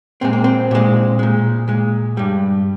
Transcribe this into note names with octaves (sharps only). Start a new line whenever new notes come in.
A#2 G#3 C4
A#3
C4
A#2 G#3
A#2 G#3
A#2 G#3
G2 G3